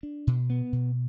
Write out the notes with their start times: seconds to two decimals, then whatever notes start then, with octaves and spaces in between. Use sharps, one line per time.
0.03 D4
0.27 B2
0.50 B3
0.72 B2